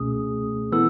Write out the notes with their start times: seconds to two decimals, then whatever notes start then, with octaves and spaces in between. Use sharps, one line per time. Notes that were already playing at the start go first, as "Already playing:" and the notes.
Already playing: C#2 B2 A3 C#4 G#4 D#6
0.72 E3 B3 E4 A4 E6